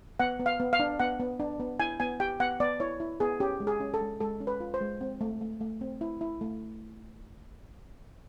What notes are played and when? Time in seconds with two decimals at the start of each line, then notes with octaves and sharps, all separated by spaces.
0.20 B3 F#5
0.40 B3
0.46 F5
0.60 B3
0.73 F5
0.80 D4
1.00 B3 F#5
1.20 B3
1.40 D4
1.60 B3
1.80 E4 G#5
2.00 B3 G#5
2.20 G4 G5
2.40 B3 F#5
2.60 B3 D5
2.80 E4 C#5
3.00 E4
3.20 B3 G#4
3.40 C#4 G4
3.60 G#3
3.67 G#4
3.80 C#4
3.94 A4
4.01 G#3
4.20 G#3 A4
4.40 C#4
4.47 B4
4.60 F4
4.74 C5
4.81 G#3
5.01 C4
5.21 A3
5.41 A3
5.61 A3
5.81 C4
6.01 E4
6.21 E4
6.41 A3